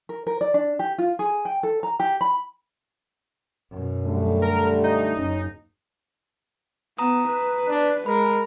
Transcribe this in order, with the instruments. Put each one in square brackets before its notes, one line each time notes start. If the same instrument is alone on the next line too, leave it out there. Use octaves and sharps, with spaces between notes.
[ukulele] A#4
A#4
D5
D4
G4
F4
G#4
G5
A4
A#5
G4
B5
[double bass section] F#2 B2
[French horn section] D3 G3 A3
[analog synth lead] A#4
D#4
[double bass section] F#1 [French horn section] C#4
[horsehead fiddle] B3 [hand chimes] A#5 D#6
[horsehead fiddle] B4
[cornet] D4
[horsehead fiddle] G#3 [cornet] A#4 [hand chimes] B5